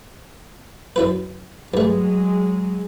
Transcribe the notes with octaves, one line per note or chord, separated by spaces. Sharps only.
F#2 E4 B4
G2 F#3 G#3 A3